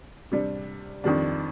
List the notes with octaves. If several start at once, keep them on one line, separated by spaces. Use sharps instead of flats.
C3 G3 D4
F2 D#3 G3 D4